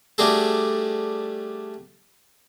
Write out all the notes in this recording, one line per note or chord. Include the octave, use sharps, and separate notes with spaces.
G3 A3 D4 F#4 G#4 A4